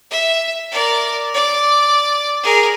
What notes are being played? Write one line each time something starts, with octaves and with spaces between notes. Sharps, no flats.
E5
A#4 D5
D5
G#4 A#4